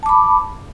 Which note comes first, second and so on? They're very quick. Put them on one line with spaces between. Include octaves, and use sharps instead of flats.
A5 D6 B5